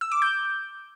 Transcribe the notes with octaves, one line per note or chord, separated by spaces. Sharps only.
E6
D6
G6